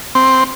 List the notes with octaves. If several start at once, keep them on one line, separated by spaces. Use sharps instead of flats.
C4